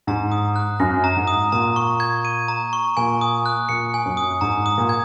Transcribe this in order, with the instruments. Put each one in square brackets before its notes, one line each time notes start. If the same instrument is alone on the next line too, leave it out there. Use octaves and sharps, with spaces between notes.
[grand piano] G#2 [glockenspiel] A#5
[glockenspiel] D#6
F#6
[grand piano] F#2 [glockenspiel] A#6
[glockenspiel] A#5
[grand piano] G#2
[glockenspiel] D#6
[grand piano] A#2 [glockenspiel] A#5
[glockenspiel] C#6
G#6
D#7
A#5
C#6
[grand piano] A#2 [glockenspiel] G#5
[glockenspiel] D#6
F#6
[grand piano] A#2 [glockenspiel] C#7
[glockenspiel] G#5
[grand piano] F#2
[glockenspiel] D#6
[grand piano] G#2 [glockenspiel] A#5
[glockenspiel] D#6
[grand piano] A#2
[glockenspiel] G#6